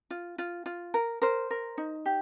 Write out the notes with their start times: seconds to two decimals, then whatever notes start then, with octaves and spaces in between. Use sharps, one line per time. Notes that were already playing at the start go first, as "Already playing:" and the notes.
0.11 F4
0.38 F4
0.66 F4
0.94 A#4
1.22 A#4 C5
1.51 A#4
1.78 D#4
2.06 G4